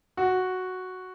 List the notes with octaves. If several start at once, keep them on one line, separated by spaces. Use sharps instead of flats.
F#4